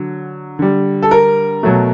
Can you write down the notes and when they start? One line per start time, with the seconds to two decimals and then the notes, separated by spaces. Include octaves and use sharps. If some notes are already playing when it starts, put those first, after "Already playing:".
Already playing: D3 F#3
0.59 D3 G3
1.03 A4
1.11 A#4
1.63 B2 F#3 A3